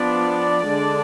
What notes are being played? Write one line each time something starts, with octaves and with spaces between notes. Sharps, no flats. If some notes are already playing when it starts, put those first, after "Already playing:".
Already playing: F3 B3 D4 D5
D3 G#3 D4